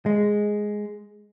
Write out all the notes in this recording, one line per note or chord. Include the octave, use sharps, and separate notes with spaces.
G#3